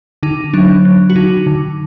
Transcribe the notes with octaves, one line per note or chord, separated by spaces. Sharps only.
D3 D#4
F#3 D4
F#3
F#4
D3 D#4
D3